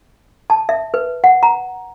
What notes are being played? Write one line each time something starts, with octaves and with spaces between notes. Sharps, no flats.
A5
E5
B4
F#5
A#5